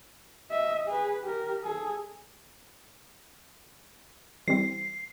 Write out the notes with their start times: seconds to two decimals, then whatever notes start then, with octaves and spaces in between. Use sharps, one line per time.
0.50 D#5 E5
0.88 G#4 B4
1.24 G4 A#4
1.64 G#4 A4
4.48 E3 G3 C4 C7